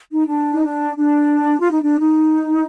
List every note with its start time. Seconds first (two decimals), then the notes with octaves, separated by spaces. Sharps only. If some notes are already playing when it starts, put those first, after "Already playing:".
0.10 D#4
0.27 D4
0.53 D#4
0.62 D4
0.96 D4
1.60 F4
1.71 D#4
1.81 D4
1.98 D#4